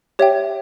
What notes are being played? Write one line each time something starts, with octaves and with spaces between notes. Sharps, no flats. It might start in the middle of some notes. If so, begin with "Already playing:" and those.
G4 C#5 E5 G5